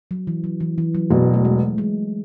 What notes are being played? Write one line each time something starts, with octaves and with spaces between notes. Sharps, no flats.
F#3
E3
F#3
E3
E3
F#3
E1 E2 B2 F#3
A3
G#3
G#3